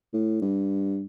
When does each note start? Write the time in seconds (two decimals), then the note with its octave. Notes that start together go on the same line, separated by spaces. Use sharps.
0.13 A2
0.41 G2